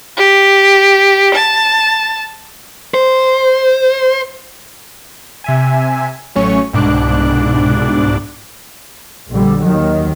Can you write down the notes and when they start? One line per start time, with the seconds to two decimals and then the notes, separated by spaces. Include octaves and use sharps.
0.17 G4
1.35 A5
2.94 C5
5.44 C3 E5 G#5
6.35 A1 F#3 A3 C#4 C#5 C#6
6.73 C2 G#2 B2 D4 D6 F#6
9.30 A#1 D3 G3
9.63 D#2 D#3 F#3